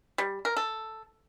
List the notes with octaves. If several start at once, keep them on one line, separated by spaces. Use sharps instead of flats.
G3
A#4
A4